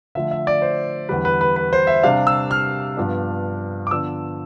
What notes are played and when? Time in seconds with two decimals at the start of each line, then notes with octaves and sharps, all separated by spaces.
0.15 D3 F3 A3 E5
0.31 E5
0.47 D5
0.62 C5
1.09 E2 D3 G3 B4
1.25 B4
1.41 B4
1.56 B4
1.73 C5
1.87 E5
2.03 C3 G3 D4 F5
2.27 E6
2.51 F6
2.97 G2 F3 B3 D4
3.87 D6
3.91 D3 F3 B3 D4 E6